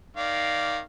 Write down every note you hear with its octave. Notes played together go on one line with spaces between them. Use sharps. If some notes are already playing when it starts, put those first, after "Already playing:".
D#3 D5 F5